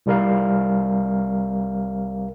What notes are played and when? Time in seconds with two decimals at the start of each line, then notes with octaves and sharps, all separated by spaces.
0.06 C2 G3 A#4 F5